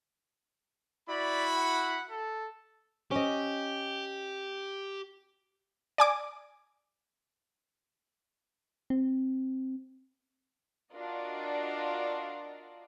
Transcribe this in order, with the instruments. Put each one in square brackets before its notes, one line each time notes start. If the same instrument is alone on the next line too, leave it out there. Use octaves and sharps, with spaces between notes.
[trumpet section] E4 F#4 B5 [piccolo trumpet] D5
[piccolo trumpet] F#5
A4
[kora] C#4 D#5 [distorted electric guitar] G4
[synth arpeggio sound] D5 G#5 D6
[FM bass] C4
[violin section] D4 F4 F#4 A#4 D5 D#5